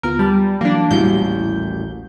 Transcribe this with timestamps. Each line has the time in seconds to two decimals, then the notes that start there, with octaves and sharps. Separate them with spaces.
0.03 D2 B3 F4 A#4
0.19 G3 A5 B5 A6
0.61 E3 F#3 A#3 D4
0.91 A1 D#2 A#2 G3 E4 F#4 G6